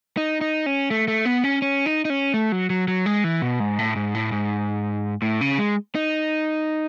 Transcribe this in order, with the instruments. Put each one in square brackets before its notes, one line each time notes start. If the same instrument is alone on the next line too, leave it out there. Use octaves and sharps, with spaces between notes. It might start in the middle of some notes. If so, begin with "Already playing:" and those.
[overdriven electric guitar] D#4
D#4
C#4
A3
A3
B3
C#4
C#4
D#4
D#4
C#4
A3
F#3
F#3
F#3
G#3
E3
B2
G#2
A2
G#2
A2
G#2
A2
C#3
G#3
D#4